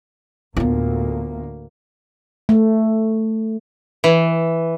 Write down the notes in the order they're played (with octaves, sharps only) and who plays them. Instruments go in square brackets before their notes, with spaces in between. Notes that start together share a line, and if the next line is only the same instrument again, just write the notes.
[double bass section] D2 A2 A#3 [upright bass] B3 F4
[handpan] A3
[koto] E3